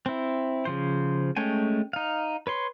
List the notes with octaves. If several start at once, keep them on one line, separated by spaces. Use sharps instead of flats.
C4 E4
C#3 F3 C5
G#3 A3 C#4 G5 G#5
D#4 F5
B4 C#5 C6